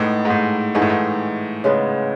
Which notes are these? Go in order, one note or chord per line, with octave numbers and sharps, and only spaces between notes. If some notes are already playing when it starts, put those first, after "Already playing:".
Already playing: A2 G#3 B3 D#4
G#2
A2
G#2 E3 A3 D#4 G#4
A2
G#2
C#3 G#3 B3